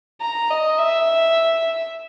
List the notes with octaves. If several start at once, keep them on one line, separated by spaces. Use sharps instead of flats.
A#5
D#5
E5